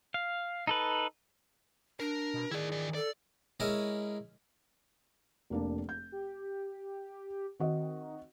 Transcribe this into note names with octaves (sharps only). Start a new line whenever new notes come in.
F5
D#4 A4 B4
D4 A#4
B2
D#3 E4 G#4 D5
E3 D5
A4 D5
G#3 C#4 E4 A#4
F1 A#3 D4
G6
G4
D#3 C4 F#4 D#5